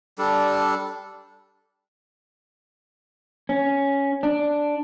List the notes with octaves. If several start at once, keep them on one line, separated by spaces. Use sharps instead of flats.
G3 D4 A4
C#4
D4